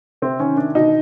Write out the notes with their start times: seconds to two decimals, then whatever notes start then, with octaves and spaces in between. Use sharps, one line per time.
0.22 C3 C4
0.40 D#3 C#4
0.57 D#3 D4
0.75 B2 D#4